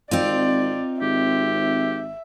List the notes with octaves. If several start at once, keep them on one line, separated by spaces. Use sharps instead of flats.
G#1 C4 D#4 F4 D5
G#1 G4 E5